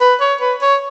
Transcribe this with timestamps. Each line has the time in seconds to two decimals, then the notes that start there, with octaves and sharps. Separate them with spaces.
0.01 B4
0.21 C#5
0.41 B4
0.61 C#5